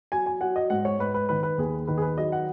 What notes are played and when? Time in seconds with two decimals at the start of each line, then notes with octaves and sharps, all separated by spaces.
0.12 F#3 G#5
0.26 G#5
0.41 F#3 F#5
0.56 D#5
0.70 G#2 F#5
0.85 C#5
0.99 G#2 B4
1.14 B4
1.29 D#3 B4
1.43 B4
1.58 D#2 G#4
1.87 D#3 B4
1.97 G#4
2.02 B4
2.17 F#3 D#5
2.32 F#5